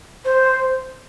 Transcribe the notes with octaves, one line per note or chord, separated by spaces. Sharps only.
C5